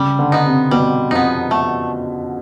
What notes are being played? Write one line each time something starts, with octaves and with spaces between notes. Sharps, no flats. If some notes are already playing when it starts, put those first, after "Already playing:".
Already playing: C#3 G3
D3
B3 D#4
C3
B2 G3
F2 B3 D#4
A3